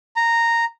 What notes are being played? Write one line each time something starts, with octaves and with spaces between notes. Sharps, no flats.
A#5